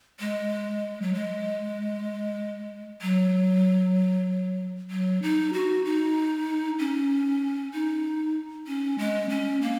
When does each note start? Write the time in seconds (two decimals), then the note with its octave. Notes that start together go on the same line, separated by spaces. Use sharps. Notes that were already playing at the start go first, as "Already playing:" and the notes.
0.20 G#3
1.02 F#3
1.14 G#3
3.02 F#3
4.91 F#3
5.22 D#4
5.53 F#4
5.85 D#4
6.79 C#4
7.74 D#4
8.67 C#4
8.98 G#3
9.29 C#4
9.62 A#3